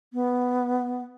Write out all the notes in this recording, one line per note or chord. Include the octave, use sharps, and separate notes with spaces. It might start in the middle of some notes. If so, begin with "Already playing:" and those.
B3